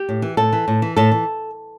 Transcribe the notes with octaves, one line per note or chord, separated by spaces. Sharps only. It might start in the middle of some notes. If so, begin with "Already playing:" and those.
Already playing: G4
A2
E3
A2 A4
E3
A2
E3
A2 A4
E3